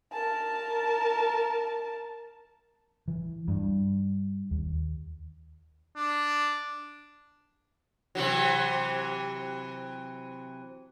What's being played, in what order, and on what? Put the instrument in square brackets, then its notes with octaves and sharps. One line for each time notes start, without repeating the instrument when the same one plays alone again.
[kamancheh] A#4 A5
[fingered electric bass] E3
G2
D#2
[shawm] D4
[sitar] C3 E3 F#3